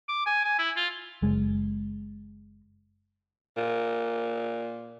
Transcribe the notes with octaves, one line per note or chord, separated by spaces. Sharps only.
D6
G#5
G#5
E4
F4
F#1 G#3
A#2